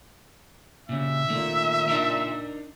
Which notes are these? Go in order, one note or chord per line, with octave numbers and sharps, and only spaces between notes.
A#2 C#3 E5
A#2 D#3 A3
D4 D#4 A#4